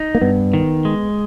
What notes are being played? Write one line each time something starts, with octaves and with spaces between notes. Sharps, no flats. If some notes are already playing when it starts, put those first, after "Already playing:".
Already playing: D#4
A#3
G2 B3
D#3
G#3